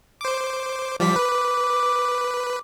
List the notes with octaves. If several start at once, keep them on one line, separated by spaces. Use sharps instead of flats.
C5 D6
F3 G3 D6 B6
B4